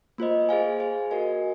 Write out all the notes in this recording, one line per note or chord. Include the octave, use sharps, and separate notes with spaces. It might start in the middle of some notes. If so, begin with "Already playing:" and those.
A#3 F4 C5 D#5
G#4 C5 F5 G#5
G#4 C5 F5 G#5
F#4 A#4 D#5 G#5